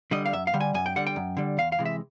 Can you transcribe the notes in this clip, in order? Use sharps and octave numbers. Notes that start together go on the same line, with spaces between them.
D3 G3 D#5
F5
F#2 E5
F5
D3 G3
G#5
F#2 G#5
G5
D3 G3 F#5
G5
F#2
D3 G3
E2 F5
F5
C3 E3 G#3
E5